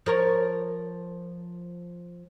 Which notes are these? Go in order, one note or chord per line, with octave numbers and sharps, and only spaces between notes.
F3 A#4 C#5